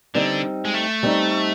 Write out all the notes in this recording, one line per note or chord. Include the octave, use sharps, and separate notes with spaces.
D3 G3 C4 D#4
G#3
A3
G3 C4 D#4